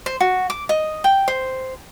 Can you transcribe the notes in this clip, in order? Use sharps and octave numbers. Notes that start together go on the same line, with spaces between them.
C5
F#4
D6
D#5
G5
C5